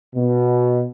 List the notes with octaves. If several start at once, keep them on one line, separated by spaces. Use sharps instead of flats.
B2